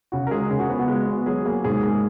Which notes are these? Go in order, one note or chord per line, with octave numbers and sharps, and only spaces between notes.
C#3 F#4
A#4
G#3 G#4
C#3 G#4
F#4
B3
F#4
G#3
B3
F#3 G#4
A#3 G#4
G#2 G#4
G#2 G#4